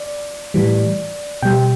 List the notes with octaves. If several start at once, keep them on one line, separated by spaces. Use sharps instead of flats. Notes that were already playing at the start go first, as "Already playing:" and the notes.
Already playing: D5
A2 E3 G3
B2 G3 G5